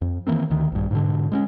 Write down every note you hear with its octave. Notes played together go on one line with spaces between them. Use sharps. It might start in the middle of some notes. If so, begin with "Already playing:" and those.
F2
D#3 E3 A#3 C4
D2 D#3
A#1 G2
G#2 B2 D3
G#3 C4 C#4